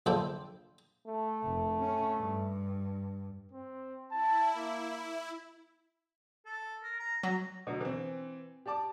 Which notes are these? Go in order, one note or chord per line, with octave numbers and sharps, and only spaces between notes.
A#1 D3 E4 A4 C5 G5
A3
F1
C#4
G2
C4
E4 A5
A#3
A4
A#4
A#5
F#3 A#5
B2 D3 F#3
E3 C4
G4 D5 A5 D6